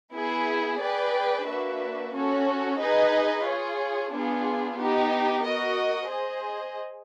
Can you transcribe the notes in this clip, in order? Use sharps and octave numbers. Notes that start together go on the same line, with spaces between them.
B3 E4 G#4
G#4 B4 D5 G5
A#3 D4 F#4 B4 E5
C#4 F#4 A4 C#5
D#4 G#4 B4 D#5
F4 G#4 C#5
B3 D4 F4 G#4
B3 D#4 G4
F#4 A#4 D#5
G#4 C5 D#5